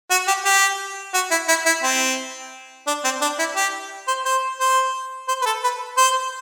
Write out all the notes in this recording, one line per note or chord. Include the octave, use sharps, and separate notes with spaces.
F#4
G4
G4
F#4
E4
E4
E4
C4
D4
C4
D4
E4
G4
C5
C5
C5
C5
B4
A4
B4
C5